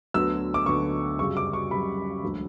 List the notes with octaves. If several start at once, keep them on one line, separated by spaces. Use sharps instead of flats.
D2 D3 F#3 B3 E6
D6
D2 D3 F#3 B3 C#6
F#2 C#3 G3 C#6
D6
C#6
F#2 C#3 G3 B5
E1 D2 D3 F#3